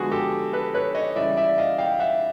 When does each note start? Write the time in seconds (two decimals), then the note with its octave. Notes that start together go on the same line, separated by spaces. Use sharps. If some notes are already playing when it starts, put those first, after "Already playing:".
Already playing: D3 F3 G#3 B3 F#4 G#4
0.11 G4 A4
0.53 A4 B4
0.74 B4 C#5
0.95 C#5 D#5
1.16 C#3 E3 G3 D5 E5
1.37 D5 E5
1.58 D#5 F5
1.78 F5 G5
2.00 E5 F#5